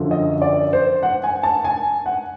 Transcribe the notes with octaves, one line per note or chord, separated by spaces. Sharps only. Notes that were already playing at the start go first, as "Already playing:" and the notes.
Already playing: F#2 D3 F3
D#5
D5
C5
F#5
G#5
A5
G#5
F#5